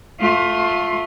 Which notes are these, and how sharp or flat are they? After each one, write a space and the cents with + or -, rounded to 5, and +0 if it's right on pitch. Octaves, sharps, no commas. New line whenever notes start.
A3 +0 F4 +15